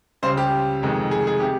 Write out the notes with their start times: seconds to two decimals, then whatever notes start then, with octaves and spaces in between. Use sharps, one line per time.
0.22 C#2 C#3 G3 C5
0.37 G4
0.83 F1 F2 D#3 G#3
1.11 G#4
1.27 G#4
1.40 C3 G4